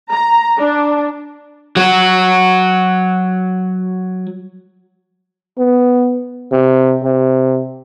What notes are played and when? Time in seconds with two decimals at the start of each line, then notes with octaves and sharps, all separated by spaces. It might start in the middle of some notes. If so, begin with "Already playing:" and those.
0.11 A#5
0.58 D4
1.76 F#3 F#4
5.58 B3
6.52 C3
7.03 C3